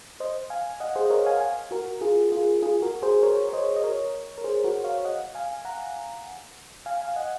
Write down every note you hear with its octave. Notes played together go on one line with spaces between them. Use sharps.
C5 D#5
F5 G#5
D#5 F#5
G#4 C5
D#5
A#4 C#5
F5 G#5
F5 G#5
F#4 A#4
F4 G#4
F4 G#4
F4 G#4
F#4 A#4
G#4 C5
A#4 C#5
C#5
C5 D#5
D#5
A#4 C#5
A#4
G#4 C5
F#4 A#4
C#5 F5
D#5 F#5
F5 G#5
F#5 A#5
F5 G#5
F5 G#5
D#5 F#5